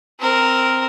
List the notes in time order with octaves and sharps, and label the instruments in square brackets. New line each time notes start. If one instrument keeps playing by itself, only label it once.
[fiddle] C4 A#4